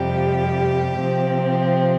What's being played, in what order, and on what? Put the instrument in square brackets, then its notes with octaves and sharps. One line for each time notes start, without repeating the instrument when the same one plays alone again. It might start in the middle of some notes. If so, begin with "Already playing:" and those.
Already playing: [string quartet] F2 C3 G3 G4
C3 F3 C4